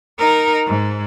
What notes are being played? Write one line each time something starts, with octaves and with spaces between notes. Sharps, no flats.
D#4 A#4
G#2